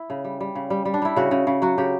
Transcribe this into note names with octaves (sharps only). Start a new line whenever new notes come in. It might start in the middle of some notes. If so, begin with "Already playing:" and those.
Already playing: E4
C#3
G3
G3
C#3
G3
G3
D4
G3 E4
C#3 F#4
C#3
C#3
F#3 F#4
C#3 G4